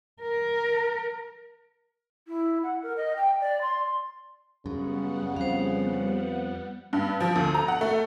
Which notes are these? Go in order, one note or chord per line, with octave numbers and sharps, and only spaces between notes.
A#4
E4
F#5
A#4
D#5
G5
D5
C6
F#2 C#3 G3 B3 F#5
F2 C5 F5
G2
F3
D2
A#5
F#5
A3